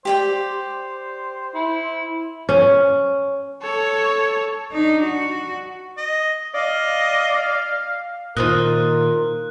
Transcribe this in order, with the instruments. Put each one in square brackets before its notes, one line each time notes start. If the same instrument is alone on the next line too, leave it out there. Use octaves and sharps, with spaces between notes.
[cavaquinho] G4 D5 G5 [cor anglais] C5
[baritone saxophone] E4
[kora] C#4
[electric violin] A4 C#5
[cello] D4 D#4
F#4
[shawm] D#5
[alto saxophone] D5 [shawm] D#5 [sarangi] F5
[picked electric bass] A#2 D#3 [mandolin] F4 C5 D#5 [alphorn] A#4 [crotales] F#6